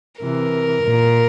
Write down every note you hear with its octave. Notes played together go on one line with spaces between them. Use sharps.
C3 E3 A#4
A#2